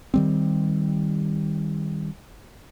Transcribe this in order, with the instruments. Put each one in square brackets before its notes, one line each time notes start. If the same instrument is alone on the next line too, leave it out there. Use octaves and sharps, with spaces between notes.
[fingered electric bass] D#3 G3 C4